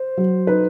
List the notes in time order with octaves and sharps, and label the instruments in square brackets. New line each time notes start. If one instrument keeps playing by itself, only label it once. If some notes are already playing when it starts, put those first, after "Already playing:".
Already playing: [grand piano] C5
[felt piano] F#3
[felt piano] D#4 [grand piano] B4